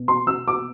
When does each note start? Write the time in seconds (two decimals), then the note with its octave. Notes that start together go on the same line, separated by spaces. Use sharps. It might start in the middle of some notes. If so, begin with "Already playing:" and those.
Already playing: B2 B3
0.08 C6
0.27 E6
0.48 D6